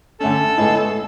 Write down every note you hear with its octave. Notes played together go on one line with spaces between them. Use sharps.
D3 A3 C#4 A4
A2 G#3 B3 E4 G#4